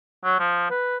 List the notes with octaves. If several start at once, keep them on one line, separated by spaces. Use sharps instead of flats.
F#3
F3
B4